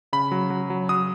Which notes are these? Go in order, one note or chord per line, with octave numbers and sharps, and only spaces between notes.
C#3 B5
F#3
F#3
F#3
F#3 D#6